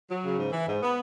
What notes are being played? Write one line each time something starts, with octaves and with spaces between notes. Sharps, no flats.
F#3
C#3
G#2
E3
G#2
B3